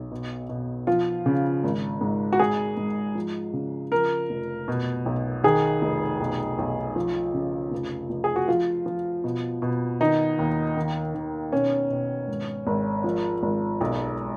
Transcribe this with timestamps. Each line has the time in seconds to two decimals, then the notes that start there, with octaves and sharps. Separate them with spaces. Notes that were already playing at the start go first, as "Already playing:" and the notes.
Already playing: B1
0.11 B2
0.49 B2
0.87 F3 F4
1.26 C#3
1.64 G#1
2.01 G#2
2.33 F#4
2.39 G#2 G#4
2.77 G#2
3.15 F3
3.53 C#3
3.92 F3 A#4
4.30 F1
4.68 B2
5.06 B1
5.44 D#3 G#4
5.82 F1
6.20 B1
6.58 B1
6.96 F3
7.34 C#3
7.71 F1
8.10 F1
8.24 G#4
8.36 F#4
8.48 F3 F4
8.86 F3
9.24 B2
9.62 B2
10.00 D#3 D#4
10.39 D#2
10.77 D#3
11.14 D#3
11.52 B2 C#4
11.90 B2
12.28 G#1
12.67 G#1
13.04 F3
13.43 G#1
13.81 B1